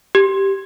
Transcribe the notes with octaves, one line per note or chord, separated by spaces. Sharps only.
G4